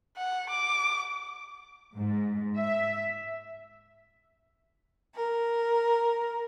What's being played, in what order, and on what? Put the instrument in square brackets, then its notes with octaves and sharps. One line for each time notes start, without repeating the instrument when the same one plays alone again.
[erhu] F#5
D6
[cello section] G#2
E5
[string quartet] A#4